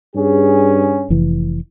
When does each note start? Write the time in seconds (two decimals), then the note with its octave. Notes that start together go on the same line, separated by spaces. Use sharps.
0.16 G2 C#4 G#4
1.10 F1 E3